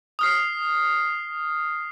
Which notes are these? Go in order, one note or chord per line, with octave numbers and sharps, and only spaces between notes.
D#6 F6 C7